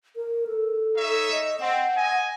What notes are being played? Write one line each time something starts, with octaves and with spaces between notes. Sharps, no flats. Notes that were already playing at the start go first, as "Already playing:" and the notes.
A#4
A4
D#4 C#5 E5
D#5
C4 F#5
D#5 G#5